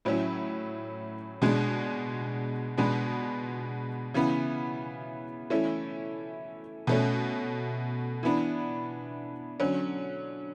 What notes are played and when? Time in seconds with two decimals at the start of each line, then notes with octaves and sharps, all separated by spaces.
0.05 A2 F#3 C#4 E4
1.42 B2 G#3 D4
2.77 B2 G#3 B3 D4
4.14 C#3 E3 B3
5.50 E3 A3 C#4 E4
6.87 B2 A3 C#4
8.23 E3 B3 D4
9.60 D3 F#3 C#4